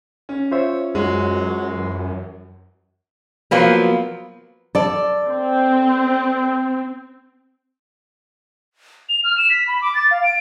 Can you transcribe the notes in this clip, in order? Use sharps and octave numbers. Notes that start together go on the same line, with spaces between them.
C#4
F4 C5 C#5 E5
F#2 F#3 G#3
E3
F3 F#3 A#3 B3
A4 D5
C4
F7
F6
E7
B6
B5
D6
A6
F5
D7